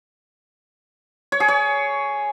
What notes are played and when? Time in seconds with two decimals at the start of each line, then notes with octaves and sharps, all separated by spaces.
1.32 C#5
1.40 G#4
1.48 C#5